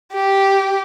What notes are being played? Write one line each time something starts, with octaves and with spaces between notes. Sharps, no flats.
G4